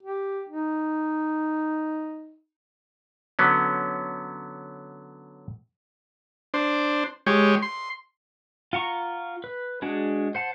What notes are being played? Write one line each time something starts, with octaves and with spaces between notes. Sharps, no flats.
G4
D#4
D3 F#3 B3 C#4
D4 C5
G#3 G4 C#5
C6
F4 F#5 A#5 C#6
B4
G#3 D4 F#4 G#4
C5 F#5 A5